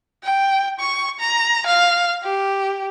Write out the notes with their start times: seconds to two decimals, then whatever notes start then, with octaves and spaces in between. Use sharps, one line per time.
0.24 G5
0.80 C#6
1.20 A#5
1.67 F5
2.23 G4